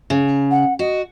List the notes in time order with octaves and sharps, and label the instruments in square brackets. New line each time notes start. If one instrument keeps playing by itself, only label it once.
[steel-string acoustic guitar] C#3
[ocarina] F#5
[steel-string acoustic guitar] F#4 [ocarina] D#5